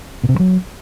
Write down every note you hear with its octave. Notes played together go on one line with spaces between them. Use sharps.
B2
C3
G2
F#3